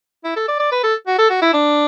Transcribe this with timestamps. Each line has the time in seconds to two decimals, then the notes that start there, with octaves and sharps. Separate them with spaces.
0.24 E4
0.36 A4
0.48 D5
0.60 D5
0.72 B4
0.84 A4
1.07 F#4
1.18 A4
1.30 F#4
1.42 E4
1.53 D4